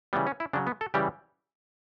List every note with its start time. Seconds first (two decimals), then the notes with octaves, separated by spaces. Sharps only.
0.13 C#3 E3 G3 B3
0.27 C#4
0.40 E4
0.53 C#3 F#3 D4
0.67 B3
0.81 A4
0.94 C#3 E3 G3 G4